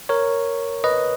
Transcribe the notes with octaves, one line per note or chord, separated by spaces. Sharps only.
A#4 C#5
B4 D#5